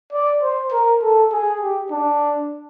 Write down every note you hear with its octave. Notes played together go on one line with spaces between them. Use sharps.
D5
C5
A#4
A4
G#4
G4
D4